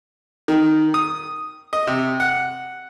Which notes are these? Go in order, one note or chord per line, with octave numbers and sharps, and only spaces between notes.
D#3
D#6
D#5
C3
F#5